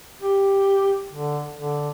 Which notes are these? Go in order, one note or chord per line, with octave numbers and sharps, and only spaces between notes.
G4
D3
D3